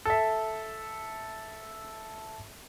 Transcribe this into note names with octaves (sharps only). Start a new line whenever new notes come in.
A4 E5